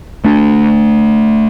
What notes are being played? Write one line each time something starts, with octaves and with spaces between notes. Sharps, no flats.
A3 D4